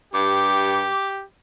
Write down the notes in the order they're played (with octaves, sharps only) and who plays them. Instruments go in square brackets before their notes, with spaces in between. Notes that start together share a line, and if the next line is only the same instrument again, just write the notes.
[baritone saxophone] G2 [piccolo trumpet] G4 [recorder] D6